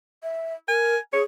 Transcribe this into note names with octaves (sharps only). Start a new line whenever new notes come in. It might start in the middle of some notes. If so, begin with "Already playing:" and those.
E5
A#4 G#5
G#4 C#5